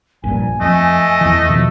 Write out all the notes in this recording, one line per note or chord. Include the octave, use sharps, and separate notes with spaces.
A#1 G2 A#2 G#5
F2 A3 D#5
E2 E3
B2 D#3 F3